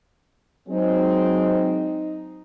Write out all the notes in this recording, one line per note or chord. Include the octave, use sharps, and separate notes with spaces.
F#3 G#3 C4 D#4